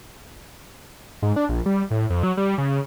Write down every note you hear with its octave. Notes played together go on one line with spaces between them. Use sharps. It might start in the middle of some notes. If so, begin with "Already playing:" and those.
G#2
D4
A#1
G3
A2
F2
F#3
G3
C#3